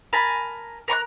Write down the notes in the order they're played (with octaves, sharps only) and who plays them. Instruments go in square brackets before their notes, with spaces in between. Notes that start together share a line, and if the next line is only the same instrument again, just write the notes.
[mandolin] A#4 G#5 A5 B5
A#4 A#5 C#6 F#6